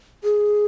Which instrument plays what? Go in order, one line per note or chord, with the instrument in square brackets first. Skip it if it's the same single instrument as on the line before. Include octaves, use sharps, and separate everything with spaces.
[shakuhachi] G#4